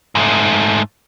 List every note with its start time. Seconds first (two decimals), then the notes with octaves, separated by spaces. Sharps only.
0.15 G#2 A3